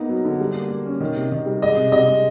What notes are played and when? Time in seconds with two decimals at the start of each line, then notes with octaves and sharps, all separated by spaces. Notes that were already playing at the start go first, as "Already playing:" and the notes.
Already playing: A#3 B3 D#4
0.09 F#3
0.25 D3
0.40 G3
0.55 A#3
0.70 A#3
0.86 C#4
1.00 D#3
1.16 C3
1.32 D#3
1.46 G3
1.62 G#3 D#5
1.77 C3
1.92 C3 D#5
2.07 G#3